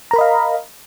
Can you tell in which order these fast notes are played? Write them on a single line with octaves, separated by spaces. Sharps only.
A#5 A#4 B5 D#5 F5